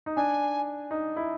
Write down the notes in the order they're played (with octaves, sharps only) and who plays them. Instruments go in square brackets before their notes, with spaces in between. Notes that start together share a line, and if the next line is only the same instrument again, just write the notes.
[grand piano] D#4
[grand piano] D4 [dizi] G#5
[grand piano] D#4
E4